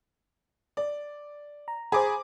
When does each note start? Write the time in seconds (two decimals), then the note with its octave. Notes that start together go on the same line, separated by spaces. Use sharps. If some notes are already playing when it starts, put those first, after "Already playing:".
0.77 D5
1.68 A#5
1.92 G#4 C5 A#5 B5 D6